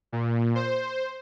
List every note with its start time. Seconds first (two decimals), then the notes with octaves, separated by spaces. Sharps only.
0.12 A#2
0.55 C5